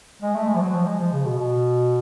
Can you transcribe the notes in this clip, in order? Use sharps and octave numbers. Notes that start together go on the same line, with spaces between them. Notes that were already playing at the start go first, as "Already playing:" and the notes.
G#3
A3
G#3
F3
F#3
F3
G#3
F3
C#3
B2
B2